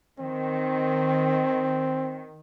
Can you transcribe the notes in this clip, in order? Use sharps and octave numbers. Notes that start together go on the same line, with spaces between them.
D#3 C4